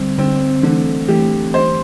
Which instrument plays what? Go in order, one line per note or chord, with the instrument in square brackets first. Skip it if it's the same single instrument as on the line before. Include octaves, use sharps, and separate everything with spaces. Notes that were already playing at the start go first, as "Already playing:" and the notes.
Already playing: [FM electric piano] D3 G3 [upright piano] C4
[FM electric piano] D3 G3 [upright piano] C4
[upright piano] D3 [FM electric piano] E3 A3
[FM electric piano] E3 A3 [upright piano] G4
[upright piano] C5